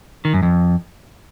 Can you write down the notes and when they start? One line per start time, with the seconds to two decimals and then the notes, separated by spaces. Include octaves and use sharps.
0.25 D#3
0.34 F#2
0.43 F2